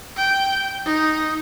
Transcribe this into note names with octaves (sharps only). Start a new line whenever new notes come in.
G5
D#4